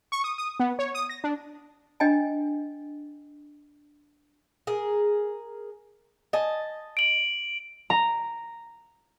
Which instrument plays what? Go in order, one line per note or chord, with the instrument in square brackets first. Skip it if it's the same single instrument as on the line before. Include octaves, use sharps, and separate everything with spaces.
[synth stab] C#6
D#6
D#6
B3
C#5
D#6
A#6
D4
[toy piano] D4 D#5 G5 G#5
[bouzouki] G#4 A#4
D#5 G#5 A5
[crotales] D7 F#7
[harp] A#5